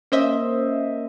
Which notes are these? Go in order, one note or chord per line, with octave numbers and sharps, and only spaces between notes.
A#3 C#4 C5 D#5 E5